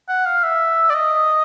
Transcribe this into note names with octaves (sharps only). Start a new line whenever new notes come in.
F#5
F5
E5
D5
D#5